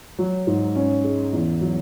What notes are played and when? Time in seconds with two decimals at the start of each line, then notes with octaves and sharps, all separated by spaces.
0.18 F#3
0.47 G#2
0.76 C#4
1.04 G#3
1.33 E2
1.61 F#3